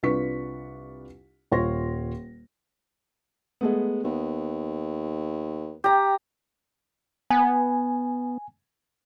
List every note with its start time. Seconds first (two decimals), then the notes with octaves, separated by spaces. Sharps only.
0.03 C2 D4 F4 B4 C#6 B6
1.51 D#1 F4 C#5 C6 A#6
3.61 G#3 A3 B3
4.04 D#2 B3
5.84 G4 G5 A#5
7.31 B3 G#5